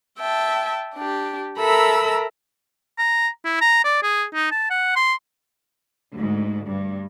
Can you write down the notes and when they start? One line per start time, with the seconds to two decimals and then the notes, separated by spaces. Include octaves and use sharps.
0.18 E5 G5 A5
0.95 D4 G4
1.59 A4 A#4 E5 A#5 B5 E6
2.98 A#5
3.45 E4
3.61 A#5
3.84 D5
4.03 G#4
4.34 D#4
4.51 A5
4.70 F#5
4.96 C6
6.15 D2 G#2
6.66 G2